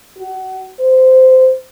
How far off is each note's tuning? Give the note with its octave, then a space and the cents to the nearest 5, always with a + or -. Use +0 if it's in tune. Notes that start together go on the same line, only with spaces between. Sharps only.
F#4 +30
C5 -15